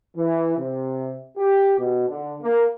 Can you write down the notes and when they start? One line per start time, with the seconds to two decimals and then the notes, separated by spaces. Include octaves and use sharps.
0.17 E3
0.58 C3
1.37 G4
1.78 B2
2.09 D3
2.42 A#3